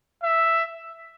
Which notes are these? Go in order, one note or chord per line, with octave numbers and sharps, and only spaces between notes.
E5